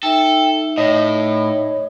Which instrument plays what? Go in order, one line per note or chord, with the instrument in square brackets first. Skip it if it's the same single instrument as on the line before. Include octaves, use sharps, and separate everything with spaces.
[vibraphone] D#4 E5 [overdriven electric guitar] A4 [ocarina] G5
[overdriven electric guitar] A2 [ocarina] C#5 [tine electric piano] D#5